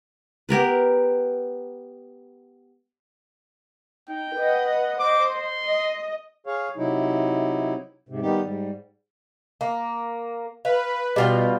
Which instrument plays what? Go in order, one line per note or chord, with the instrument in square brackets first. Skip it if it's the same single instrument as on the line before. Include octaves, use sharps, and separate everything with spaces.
[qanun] B3 G4 A#4 B4
[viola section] D#4 [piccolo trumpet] G5
[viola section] B4 D#5 F#5
[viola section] C5 D#5 [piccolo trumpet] D6
[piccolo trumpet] C6
[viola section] D#5
[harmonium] G#4 C#5 F5
C3 F#3 D#4 E4
G#2 C3
D#3 G3 B3 D#4 G4
G#2 G3
[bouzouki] A#3
[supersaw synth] B4 [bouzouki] F5
[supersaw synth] B2 [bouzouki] G3 F4 G5